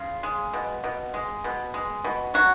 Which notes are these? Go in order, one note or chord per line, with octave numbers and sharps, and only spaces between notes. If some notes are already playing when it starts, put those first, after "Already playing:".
Already playing: C#3 F4
G#3
B2
B2
G#3
B2
G#3
B2
F#3 F#4